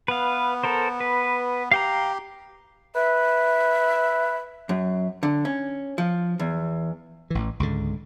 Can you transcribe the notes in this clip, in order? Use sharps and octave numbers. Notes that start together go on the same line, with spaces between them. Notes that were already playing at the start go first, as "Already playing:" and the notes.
B3 B4 F5
A4 A#4 C5
B4
G4 F5 G5 A#5
B4 E5
F#2
D3
C#4
F3
E2
A1 E3
C#2 G#2 D3